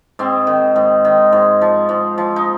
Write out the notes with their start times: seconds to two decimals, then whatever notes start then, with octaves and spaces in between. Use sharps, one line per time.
0.19 G#2 C4
0.47 D#3
0.76 G#2
1.05 D#3
1.33 G#2
1.61 F3
1.89 G#2
2.18 F3
2.36 D#4